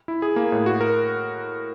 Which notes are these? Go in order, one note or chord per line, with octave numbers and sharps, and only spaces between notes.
E4
G#4
A#3
A2
F#4
A#4